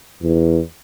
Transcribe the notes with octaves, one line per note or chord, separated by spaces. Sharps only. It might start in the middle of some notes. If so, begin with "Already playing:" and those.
E2